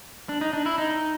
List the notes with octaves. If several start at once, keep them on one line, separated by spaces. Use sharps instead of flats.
D4
D#4
D4
E4
D#4